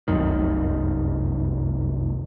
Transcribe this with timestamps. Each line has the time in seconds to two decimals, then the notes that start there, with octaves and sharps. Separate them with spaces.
0.08 F1 C2 F#2 D#3